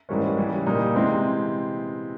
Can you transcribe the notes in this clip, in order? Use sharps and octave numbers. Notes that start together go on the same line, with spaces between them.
G#2 E3 G3 A#3 C#4
C#3 E3 G3
A#2 G3 A#3 D#4
C3 E3 G#3 C4